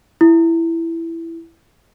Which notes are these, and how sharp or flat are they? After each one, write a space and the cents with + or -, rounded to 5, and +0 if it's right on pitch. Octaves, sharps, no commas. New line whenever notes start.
E4 +10